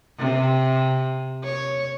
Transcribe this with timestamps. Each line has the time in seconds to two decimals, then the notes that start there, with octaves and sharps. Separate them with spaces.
0.19 C3
1.44 C#5